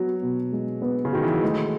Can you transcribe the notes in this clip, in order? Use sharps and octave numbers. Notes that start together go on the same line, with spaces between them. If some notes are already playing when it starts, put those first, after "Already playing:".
Already playing: F#3 B3 F#4
B2
G#3
B3
C#3
D#3 F#4
E3
F#3
G#3 A3